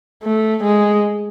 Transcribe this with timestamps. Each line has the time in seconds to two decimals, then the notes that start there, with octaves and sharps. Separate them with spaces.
0.24 A3
0.63 G#3